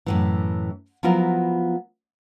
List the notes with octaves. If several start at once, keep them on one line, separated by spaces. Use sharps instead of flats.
F#2 A2 E3
F3 F#3 B3 E4 F4 A#4